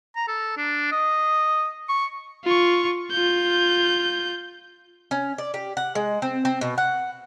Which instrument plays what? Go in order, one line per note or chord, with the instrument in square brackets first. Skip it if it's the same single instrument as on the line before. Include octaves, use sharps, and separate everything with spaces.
[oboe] A#5
A4
D4
D#5
C#6
[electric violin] F4 C#6
F4 G6
[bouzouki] C#4
D5
G4
F#5
G#3
C4
C4
B2
F#5